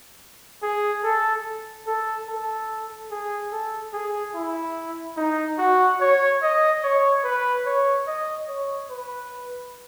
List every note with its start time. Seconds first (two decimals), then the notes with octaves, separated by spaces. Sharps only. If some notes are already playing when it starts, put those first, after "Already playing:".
0.63 G#4
1.04 A4
1.87 A4
2.28 A4
3.11 G#4
3.52 A4
3.93 G#4
4.34 E4
5.17 D#4
5.59 F#4
6.01 C#5
6.42 D#5
6.83 C#5
7.24 B4
7.66 C#5
8.07 D#5
8.48 C#5
8.91 B4